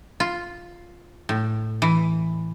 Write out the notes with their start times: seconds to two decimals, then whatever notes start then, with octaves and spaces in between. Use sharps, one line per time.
0.20 F4
1.29 A2
1.82 E3